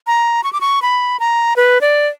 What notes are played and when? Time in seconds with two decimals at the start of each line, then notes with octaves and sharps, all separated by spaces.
0.07 A#5
0.44 C#6
0.53 D6
0.61 C#6
0.82 B5
1.20 A#5
1.56 B4
1.81 D5